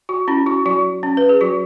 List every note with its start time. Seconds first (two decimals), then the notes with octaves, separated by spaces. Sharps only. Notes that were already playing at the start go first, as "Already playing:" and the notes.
0.09 F#4
0.28 C#4 E4
0.46 F#4
0.66 F#3 F#4
1.03 C#4
1.17 B4
1.29 G#4
1.41 F#3 F#4